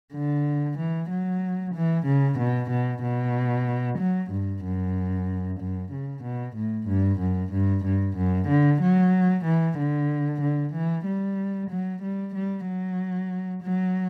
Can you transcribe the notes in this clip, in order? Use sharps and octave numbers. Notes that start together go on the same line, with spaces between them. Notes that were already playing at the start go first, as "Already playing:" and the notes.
D3
E3
F#3
E3
C#3
B2
B2
B2
F#3
G2
F#2
F#2
C#3
B2
A2
G2
F#2
G2
G2
F#2
D3
F#3
E3
D3
D3
E3
G3
F#3
G3
G3
F#3
F#3